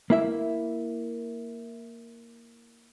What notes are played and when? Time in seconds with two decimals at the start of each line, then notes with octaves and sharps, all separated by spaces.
0.10 A#3 E4 E5